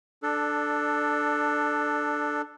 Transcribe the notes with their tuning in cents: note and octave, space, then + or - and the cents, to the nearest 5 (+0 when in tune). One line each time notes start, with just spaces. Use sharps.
D4 +10 A4 +0 D5 +30